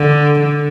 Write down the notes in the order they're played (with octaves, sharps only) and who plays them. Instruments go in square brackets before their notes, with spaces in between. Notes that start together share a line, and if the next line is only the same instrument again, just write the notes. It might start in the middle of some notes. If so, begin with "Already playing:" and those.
Already playing: [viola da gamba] D3
D3